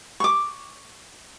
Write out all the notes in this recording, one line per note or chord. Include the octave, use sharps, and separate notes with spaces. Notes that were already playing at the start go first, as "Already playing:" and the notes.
C#6 D6